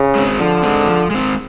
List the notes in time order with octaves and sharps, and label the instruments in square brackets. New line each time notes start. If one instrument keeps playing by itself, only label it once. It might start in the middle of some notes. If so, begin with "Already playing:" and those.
Already playing: [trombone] C#3
[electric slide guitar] G#3 C4
[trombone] D3 [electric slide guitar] F3
[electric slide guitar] G#3 C4
F3
G#3 C4